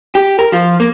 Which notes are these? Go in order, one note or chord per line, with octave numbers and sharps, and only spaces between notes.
G4
A#4
F3 F4
A#3